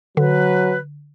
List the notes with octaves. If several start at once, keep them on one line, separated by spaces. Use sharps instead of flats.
D3 F#3 B4